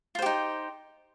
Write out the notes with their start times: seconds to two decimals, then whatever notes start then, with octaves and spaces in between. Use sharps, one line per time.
0.15 F4
0.19 C5
0.22 G4
0.26 D#4